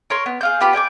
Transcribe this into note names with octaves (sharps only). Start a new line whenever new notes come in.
A#4 C#5 C6
B3
G#4 F5 G6
B3 F4 G4 B5
D5 G5 G#5 D6